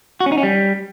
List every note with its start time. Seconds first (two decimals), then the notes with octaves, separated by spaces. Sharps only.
0.20 F#4
0.26 C#4
0.32 D#4
0.38 C#4
0.43 G3